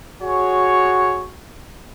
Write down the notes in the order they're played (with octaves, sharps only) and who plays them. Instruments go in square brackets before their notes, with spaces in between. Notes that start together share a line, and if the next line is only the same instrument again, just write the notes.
[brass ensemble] F#4 G#4 C#5